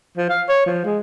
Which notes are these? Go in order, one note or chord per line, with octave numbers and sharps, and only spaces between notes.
F3
F5
C#5
F3
G#3